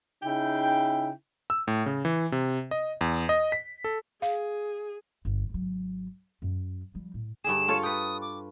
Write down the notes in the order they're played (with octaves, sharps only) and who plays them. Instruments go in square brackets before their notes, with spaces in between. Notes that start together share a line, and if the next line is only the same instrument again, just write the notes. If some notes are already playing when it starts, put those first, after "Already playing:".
[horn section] C#3 D#4 E4 G5
[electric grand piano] E6
A2
C#3
E3
C3
D#5
E2
D#5
B6
A4
[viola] G#4 [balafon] F5
[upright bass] G1
G#1 F#3
F#2
F3 G3
A2
[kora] G2 D3 G#4 [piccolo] E7
[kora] F4 A4 C#5
[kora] B4 G5 [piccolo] D#6
[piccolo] D6